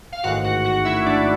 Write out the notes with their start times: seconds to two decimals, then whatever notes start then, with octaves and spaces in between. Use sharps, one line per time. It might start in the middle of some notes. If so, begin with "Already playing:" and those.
0.12 F5
0.24 A1 G#2 D#3 F#4 F#5
0.44 F#4 F#5
0.64 F#4 F#5
0.85 E4 E5
1.06 D4 D5